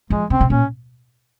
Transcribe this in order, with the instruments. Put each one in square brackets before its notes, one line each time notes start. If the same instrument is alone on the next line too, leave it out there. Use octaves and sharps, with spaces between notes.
[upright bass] F3 [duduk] G#3
[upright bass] C#3 [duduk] C4
[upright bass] C3
[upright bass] A#2 [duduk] C#4